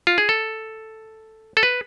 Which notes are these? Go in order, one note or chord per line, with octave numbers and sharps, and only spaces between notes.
F4
G#4
A4
A4
B4